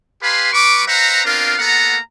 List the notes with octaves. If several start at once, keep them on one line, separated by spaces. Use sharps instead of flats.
G4 B4 F5 G#5 B5 C6
G3 B4 C#6 D6
B4 C5 E5 F#5 A#5
B3 C4 D4 F4 A#4 F5
A#3 B3 A4 F#5 A#5